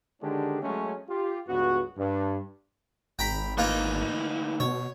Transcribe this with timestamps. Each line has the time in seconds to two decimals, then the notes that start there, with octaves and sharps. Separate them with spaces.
0.21 D3 D#3 G#3 C#4 D4 G4
0.62 F#3 G#3 A3 C#4
1.09 F4 G4
1.47 C#2 G2 B3 F#4
1.97 G2
3.19 G#1 G5 A#5 B5
3.58 D2 E3 A#3 D#4 F4
4.60 B2 C#5